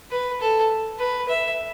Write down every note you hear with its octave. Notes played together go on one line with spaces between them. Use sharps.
B4
A4
B4
E5